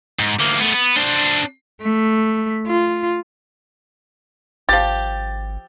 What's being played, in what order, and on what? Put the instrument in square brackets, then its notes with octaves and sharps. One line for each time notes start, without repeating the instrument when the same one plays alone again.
[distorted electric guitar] G#2
D2 A#3
A3 B3
B3
D4 C5
[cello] A3
F4
[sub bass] G#1 [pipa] F3 G4 [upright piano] A6